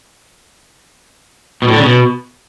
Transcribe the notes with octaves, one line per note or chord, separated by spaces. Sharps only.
B2
A2
D3
C#3
B2